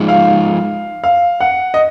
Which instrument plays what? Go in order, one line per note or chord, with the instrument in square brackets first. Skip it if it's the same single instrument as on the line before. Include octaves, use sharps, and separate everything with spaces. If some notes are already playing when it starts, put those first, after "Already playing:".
Already playing: [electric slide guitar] F3 G#3 D#4
[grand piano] F5
F5
F#5
D#5